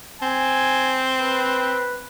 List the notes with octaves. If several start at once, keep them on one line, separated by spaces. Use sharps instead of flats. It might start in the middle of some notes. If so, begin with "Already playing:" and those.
C4 G#5
B4